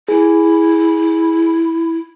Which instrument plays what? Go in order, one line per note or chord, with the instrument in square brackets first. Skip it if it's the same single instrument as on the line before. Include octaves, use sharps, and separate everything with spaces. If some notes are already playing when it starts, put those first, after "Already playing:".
[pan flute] E4 [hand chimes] G#4